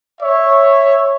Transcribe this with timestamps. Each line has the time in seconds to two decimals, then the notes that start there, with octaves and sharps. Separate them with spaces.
0.21 C#5 E5